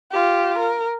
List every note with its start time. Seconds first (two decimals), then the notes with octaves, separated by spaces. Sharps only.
0.11 F4 G4
0.59 A#4